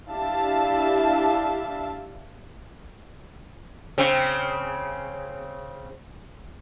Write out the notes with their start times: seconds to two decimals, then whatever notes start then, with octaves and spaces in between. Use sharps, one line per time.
0.10 D4 E4 G4 E5 F5 A5
3.98 C#3 C4